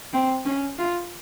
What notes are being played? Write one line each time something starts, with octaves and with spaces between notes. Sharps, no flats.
C4
C#4
F4